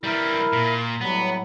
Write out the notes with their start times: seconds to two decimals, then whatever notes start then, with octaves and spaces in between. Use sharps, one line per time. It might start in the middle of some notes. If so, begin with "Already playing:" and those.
0.04 E3 G3 E4 A#4
0.53 A#2
1.01 A2 F#3 G3 B3